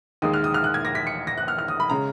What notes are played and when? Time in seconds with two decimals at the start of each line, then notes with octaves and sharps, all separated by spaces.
0.22 D#2 D#3 G#3 D#6
0.34 F6
0.44 D#6
0.54 F6
0.64 F#6
0.74 G#6
0.85 A#6
0.95 B6
1.07 C#7
1.27 A#6
1.38 F#6
1.48 F6
1.59 F6
1.68 D#6
1.80 B5
1.90 C#3 G#3 A#5